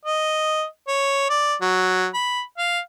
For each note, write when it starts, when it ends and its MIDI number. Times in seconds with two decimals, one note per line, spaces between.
0.05 0.64 75
0.88 1.27 73
1.29 1.55 74
1.61 2.07 54
2.14 2.42 83
2.58 2.79 77